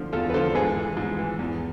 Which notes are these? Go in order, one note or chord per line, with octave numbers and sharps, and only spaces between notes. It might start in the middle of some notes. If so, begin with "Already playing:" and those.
Already playing: D3 F3
E2 F4 A4
B4
D3 F3 A4 C5
G#2 G#4 B4
E3
G#2
E3
E2